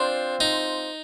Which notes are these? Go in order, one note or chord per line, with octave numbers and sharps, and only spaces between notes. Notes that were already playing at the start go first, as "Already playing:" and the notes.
Already playing: C4 D4 F4 C5
D#4